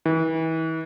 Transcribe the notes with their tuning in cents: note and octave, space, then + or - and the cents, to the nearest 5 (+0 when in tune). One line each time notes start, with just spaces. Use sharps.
E3 -35